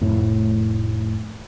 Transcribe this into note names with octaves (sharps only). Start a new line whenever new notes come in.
F1 A2